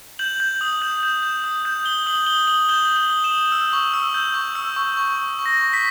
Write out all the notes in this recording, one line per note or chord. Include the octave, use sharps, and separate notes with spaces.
G6 F#7
G6
D#6
G6
G6
G6
D#6
G6
D#6 G7
D#6 F#7
D#6 G7
D#6 F#7
G6 G7
G6
F#7
D#6
E7
D#6
E6
C#6
E6
G6
C#6
E6
C#6
C#6
C#6
C#6
A#6
C#6
B6